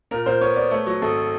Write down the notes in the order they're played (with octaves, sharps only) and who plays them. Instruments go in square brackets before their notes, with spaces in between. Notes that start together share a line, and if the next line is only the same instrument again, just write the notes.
[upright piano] A#2 [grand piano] A#4
[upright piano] A#2 [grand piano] C5
[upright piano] B3 [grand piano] C#5
[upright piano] B3 [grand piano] D5
[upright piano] A3 [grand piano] C#5
[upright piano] F#3 [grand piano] C#5
[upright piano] G#1 [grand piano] A4